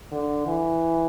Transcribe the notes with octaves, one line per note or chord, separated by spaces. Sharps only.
D3
E3